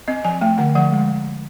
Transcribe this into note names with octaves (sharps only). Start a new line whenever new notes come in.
C4 D#5
F3 G#5
A3 G5
D3 F#5
F3 F#5
G#3